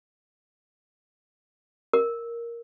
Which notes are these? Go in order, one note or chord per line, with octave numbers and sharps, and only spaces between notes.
A#4